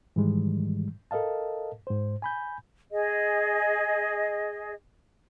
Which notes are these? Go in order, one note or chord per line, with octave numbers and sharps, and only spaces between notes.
G#2 D#3 E3 G3 G#3
A4 A#4 D#5 F5 A5
G#2 C5
G#5 B5 G6
G#4 D#5